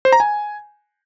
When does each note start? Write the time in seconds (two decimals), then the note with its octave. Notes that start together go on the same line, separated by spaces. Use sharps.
0.05 C5
0.12 A#5
0.20 G#5